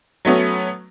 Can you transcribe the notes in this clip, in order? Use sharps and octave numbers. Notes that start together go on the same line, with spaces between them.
F#3 A3 B3 C#4